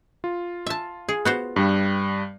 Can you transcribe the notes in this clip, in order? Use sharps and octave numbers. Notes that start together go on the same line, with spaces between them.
F4
E5 A5
G#4
B3 F#4 C5
G2 G3